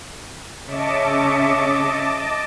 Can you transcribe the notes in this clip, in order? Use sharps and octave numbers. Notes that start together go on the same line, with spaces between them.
C#3 C#5 D#5 E5 A5 D6